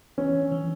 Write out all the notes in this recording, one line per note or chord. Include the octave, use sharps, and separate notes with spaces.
E3 C#4
E3
E3